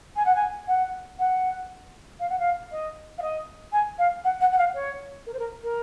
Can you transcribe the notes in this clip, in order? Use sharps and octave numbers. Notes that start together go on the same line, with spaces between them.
G#5
F#5
G#5
F#5
F#5
F5
F#5
F5
D#5
F5
D#5
G#5
F5
F#5
F#5
F#5
F5
C#5
A#4
C5
A#4
A#4